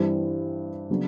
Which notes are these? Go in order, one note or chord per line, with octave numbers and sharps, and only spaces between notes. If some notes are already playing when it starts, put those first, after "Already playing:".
Already playing: G2 E3 G3 C4
C#3 F#3 B3 D4